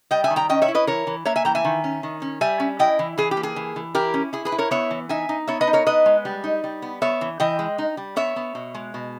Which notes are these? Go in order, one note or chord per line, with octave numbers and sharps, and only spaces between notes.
G3 D#5 G5
E5 G#5
D#3
G5 A#5
C#4 D#5 G5
C#5 E5
E4
B4 D#5
E3 A#4 C#5
E3
A#3 C#5 E5
E5 G#5
E3 G5 A#5
E5 G#5
D#3
C#4
D#3
C#4
G3 E5 G#5
C#4
E4 D#5 G5
E3
E3 G#4
G4
A#3
G#4
E3
E3
E4 G4 A#4
C#4
E4 G#4
G#4 B4
E4
A#4 C#5
B3 C#5 E5
E3
D#4 E5 G#5
D#4
B3 C#5 E5
B4 D#5
D#4
A#4 C#5
B3 B4 D#5
G#3
G3
D#4
G3
B3
B3 C#5 E5
E3
E3 D#5 G5
G#3
D#4
G3
B3 C#5 E5
B3
B2
G#3
B2